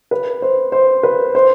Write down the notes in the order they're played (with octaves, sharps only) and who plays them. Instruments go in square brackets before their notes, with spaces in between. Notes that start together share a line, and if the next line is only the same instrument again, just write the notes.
[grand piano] B4
C5
C5
B4
C5